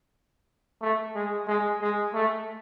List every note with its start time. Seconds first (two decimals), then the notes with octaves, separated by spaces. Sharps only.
0.82 A3
1.15 G#3
1.47 G#3
1.81 G#3
2.14 A3